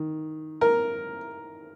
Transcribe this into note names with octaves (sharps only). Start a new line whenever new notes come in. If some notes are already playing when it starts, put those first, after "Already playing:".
Already playing: D#3
A#4